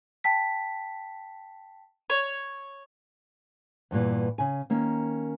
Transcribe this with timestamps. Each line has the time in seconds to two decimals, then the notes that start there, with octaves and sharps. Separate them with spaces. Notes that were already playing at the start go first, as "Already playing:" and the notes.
0.24 G5 A5 B6
2.10 C#5
3.91 E2 G2 A#2 E3
4.38 C#3 G#5
4.70 D#3 A#3 C#4